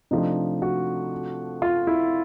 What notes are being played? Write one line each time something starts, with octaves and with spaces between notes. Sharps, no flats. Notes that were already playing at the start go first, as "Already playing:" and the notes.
C3 F3 A3 D4 D#4
F#4
F4
E4